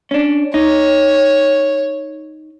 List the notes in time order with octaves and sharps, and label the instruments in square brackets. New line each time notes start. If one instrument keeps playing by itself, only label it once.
[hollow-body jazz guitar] C#4 D4
[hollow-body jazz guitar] D#4 [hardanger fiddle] C#5